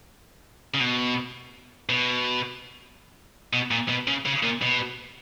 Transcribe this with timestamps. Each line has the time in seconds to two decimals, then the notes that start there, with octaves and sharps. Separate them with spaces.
0.74 C#3
0.80 B2
1.89 B2
3.53 B2
3.71 A#2
3.89 B2
4.07 C#3
4.26 C#3
4.43 A#2
4.62 B2